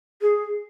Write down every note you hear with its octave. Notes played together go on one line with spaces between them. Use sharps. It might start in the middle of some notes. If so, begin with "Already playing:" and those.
G#4